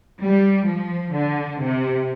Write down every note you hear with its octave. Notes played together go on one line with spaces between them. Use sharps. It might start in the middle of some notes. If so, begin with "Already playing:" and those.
G3
F3
D3
C3